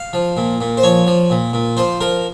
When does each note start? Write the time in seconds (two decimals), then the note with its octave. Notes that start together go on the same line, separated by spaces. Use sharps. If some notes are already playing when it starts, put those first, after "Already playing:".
Already playing: F5
0.13 F3
0.37 A#2
0.61 A#2
0.77 C5
0.83 F3 C#5
1.07 F3
1.30 A#2
1.53 A#2
1.77 F3 C5
2.01 F3 A#4